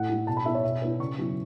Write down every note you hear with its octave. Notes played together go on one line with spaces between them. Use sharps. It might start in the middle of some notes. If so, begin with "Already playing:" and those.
Already playing: A2 F#5
A3 E4
B2 A5
B5
B3 E4 E5
C#5
B2 E5
B3 E4
C#3 C#6
F#3 B3 E4